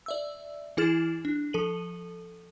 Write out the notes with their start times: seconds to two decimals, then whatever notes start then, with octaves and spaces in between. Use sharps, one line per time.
0.06 D5 E5 E6
0.77 E3 E4 G#4 F6 A6 E7
1.25 D4
1.53 F3 A4 D#7 F#7